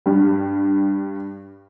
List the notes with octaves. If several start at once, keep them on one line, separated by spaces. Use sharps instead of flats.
G2 G3